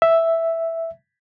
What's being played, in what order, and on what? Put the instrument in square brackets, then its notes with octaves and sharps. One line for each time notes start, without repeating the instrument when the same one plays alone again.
[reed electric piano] E5